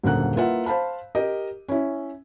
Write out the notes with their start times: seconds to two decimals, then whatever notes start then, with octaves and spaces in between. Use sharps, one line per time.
0.03 D#1 F#2 D3 A#3 F#5 F#6
0.36 A#3 E4 F4 B4 E5 F#5
0.66 C5 F5 A5 B5
1.15 G4 A#4 D#5
1.69 C#4 E4